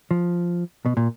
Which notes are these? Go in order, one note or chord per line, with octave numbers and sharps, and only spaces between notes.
F3
B2
A#2